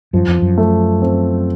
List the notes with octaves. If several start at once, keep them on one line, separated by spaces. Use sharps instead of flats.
F#2 F3
F2
F#2
A3
C4